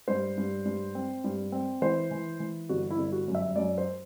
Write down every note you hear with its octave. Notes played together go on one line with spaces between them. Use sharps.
G2 C5
G2
G2
C4
G2
C4
E3 C5
E3
E3
G1 F#4
E4
G1
F#4
F#2
E5
F#2 D5
C5